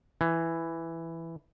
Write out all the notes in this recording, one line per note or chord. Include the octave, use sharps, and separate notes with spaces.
E3